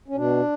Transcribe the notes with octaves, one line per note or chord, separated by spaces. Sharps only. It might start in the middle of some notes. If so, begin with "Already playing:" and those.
C#4
B2 D4